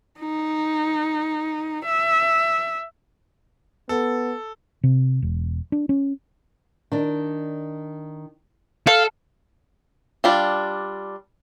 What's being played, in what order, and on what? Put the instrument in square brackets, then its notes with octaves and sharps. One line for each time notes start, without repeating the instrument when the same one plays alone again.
[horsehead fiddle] D#4
E5
[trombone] B3 [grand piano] A4
[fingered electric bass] C3
E1
D4
C#4
[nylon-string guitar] D#3 D4
[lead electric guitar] A4 [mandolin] F5
[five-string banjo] G3 D4 F4